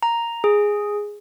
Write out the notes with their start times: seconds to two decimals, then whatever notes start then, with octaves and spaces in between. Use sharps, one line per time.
0.03 A#5
0.44 G#4